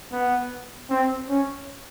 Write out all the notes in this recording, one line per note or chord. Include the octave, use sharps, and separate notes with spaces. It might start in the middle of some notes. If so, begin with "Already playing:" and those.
B3
C4
C#4